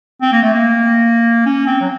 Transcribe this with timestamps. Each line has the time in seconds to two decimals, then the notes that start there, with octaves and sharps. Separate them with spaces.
0.21 C4
0.32 A#3
0.43 A3
0.53 A#3
1.46 C#4
1.66 C4
1.81 F#3